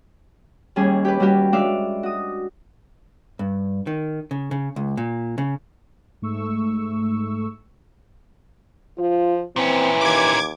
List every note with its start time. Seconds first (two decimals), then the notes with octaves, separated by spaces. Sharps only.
0.76 D#2 G3 C#4 G#4 G#5
1.05 G4 B4
1.20 G3 C#4 F#4 G4
1.53 G#3 D4 D5 E5 F5
2.03 F#4 D#6
3.39 G2
3.87 D#3
4.31 C#3
4.51 C#3
4.76 C#2
4.97 A#2
5.38 C#3
6.22 G#2 A3 C#6 E6
8.98 F3 F4
9.56 A#2 E3 C4 C#4
10.01 D#2 D6 G#6